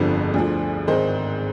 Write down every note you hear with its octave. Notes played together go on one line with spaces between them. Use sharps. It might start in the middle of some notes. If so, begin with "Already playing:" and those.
Already playing: G1 F2 D3 F3 G#4 C5
D2 D3 F3
G#1 G#2 D#3 C5 D#5